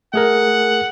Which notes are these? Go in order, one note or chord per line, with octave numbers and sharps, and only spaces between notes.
A3 G#4 A#4 F#5